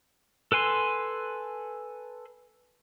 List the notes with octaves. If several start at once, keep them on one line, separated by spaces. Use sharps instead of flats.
A4 B4 G#5 C6